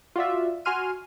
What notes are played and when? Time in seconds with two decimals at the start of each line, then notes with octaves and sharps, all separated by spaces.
0.16 F4 F#4 D5 E5
0.65 F#4 G#5 C6 F6 D#7